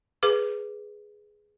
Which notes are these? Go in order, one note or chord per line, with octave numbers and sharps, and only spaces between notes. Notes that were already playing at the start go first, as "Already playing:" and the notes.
G#4 B4 D6